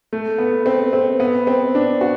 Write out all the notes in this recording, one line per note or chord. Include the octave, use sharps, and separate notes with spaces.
A3
B3
C4
C4
B3
C4
D4
F#4